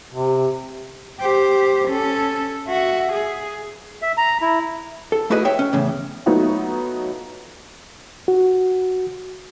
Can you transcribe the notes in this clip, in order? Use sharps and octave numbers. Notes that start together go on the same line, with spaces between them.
C3
G4 C5
C#4 A4
F#4 E5
G#4
E5
A#5
E4
A4
A3 E4 F#4 G#4 B4 D#5
C#5 E5 G5
C#4
E2 A2 C#3
F#3 A3 B3 D#4 F4 F#4
F#4